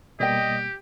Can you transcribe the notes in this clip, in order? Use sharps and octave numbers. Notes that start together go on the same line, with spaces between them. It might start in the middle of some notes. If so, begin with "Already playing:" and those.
B2 G3 A#3 G4 D5 D#5 G5